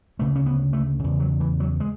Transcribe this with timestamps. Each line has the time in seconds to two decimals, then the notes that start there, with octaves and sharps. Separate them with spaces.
0.19 D2 C#3 A3
0.36 C#4
0.46 B3
0.73 A3
0.99 E2 C#3
1.20 F#3
1.40 E3
1.60 F#3
1.80 G#3